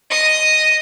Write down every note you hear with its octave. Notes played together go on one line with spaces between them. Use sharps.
D#5 D#6